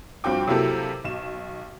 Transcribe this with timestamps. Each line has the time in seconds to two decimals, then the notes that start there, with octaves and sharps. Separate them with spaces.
0.24 G2 F3 C4 F#4 G5 D6
0.48 C3 F#3 A#3 E4 G4 A4
1.04 B1 E7